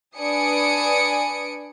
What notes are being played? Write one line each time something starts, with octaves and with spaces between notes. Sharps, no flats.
D4 B4 G#5 D#6 C#7 D7